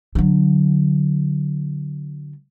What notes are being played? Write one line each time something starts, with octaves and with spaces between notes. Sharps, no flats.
D3 F#3